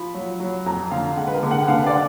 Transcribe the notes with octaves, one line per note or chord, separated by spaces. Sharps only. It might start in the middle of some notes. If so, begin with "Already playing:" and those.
Already playing: F3 B5
F#3
F#3
F2 A#5
D3 F5
G#3 F#5
B4
A#4
D3
F#5
F#5
D3 F5
B4
D5